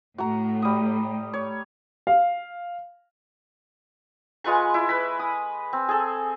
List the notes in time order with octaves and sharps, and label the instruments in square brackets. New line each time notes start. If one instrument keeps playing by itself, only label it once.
[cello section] A2 [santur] F#4 A#5
[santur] G3 D#6
C#5
[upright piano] F5
[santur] G#3 F4 B4 C#6
E4
B4 B5
D#6
C4
G#4 A4